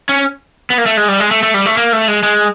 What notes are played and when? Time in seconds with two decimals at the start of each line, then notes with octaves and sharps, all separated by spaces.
0.09 C#4
0.70 B3
0.78 A#3
0.86 A3
0.97 G#3
1.08 G3
1.20 G#3
1.31 A3
1.43 A3
1.54 G3
1.66 A3
1.77 A#3
1.93 A3
2.08 G#3
2.23 G#3